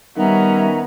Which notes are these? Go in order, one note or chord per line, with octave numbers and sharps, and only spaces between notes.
D#3 G3 B3 C#4 E5 A#5